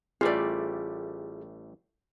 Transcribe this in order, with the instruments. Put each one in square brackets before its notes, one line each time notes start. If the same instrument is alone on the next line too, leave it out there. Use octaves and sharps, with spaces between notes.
[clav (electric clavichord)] A1 G3 A3 [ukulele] F4 D5 [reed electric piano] G#4